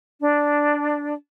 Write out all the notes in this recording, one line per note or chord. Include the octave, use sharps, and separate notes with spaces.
D4